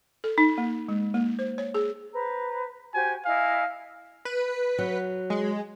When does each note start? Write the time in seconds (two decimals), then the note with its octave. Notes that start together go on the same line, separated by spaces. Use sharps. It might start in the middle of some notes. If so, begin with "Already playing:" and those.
0.24 A4
0.38 D#4
0.58 A#3
0.89 G#3
1.14 A#3
1.39 C5
1.58 C#5
1.74 G#4
2.13 B4 C5 A#5
2.94 F#4 G4 C5 G#5
3.26 E4 D#5 F5 G#5
4.25 B4
4.79 F#3
5.30 G#3